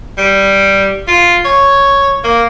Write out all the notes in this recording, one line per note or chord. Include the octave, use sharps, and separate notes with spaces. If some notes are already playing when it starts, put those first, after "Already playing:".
G3
F4
C#5
A#3